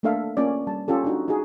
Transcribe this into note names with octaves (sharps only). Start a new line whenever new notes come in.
A3 A#3 D4 A4 E5 F5
A#3 C#4 F4 D5
G3 A5
C#4 F4 G4 A4
D4 D#4 F#4
D#4 E4 F#4 G#4